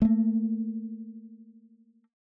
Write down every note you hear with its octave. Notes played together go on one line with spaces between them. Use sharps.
A3 A#3